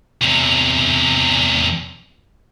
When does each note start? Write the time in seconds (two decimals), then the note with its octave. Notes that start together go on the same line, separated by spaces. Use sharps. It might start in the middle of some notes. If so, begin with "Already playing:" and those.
0.22 E2 C3